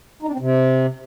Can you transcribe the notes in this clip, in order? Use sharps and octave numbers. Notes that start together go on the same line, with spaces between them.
D#4
D4
C4
C3